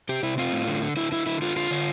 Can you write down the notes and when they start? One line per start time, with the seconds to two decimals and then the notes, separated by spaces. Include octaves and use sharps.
0.09 C3 G4
0.23 C3 E4
0.38 C4 F4
0.52 A2
0.67 D3
0.82 D3
0.97 D3 E4
1.12 D3 E4
1.26 D3 E4
1.42 D3 F4
1.56 D3 F4
1.71 D3